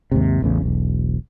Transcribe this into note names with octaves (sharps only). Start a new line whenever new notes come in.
D#2 G#2 C3
A1 E2 C#3
E1 B1